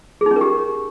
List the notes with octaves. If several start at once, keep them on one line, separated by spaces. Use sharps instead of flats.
G#4
D#4
C#4
A#4
G4